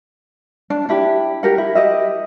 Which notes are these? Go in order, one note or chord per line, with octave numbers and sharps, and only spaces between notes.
D4
D4 E4 G4
G4 A#4 F#5
E4
G4 D#5 E5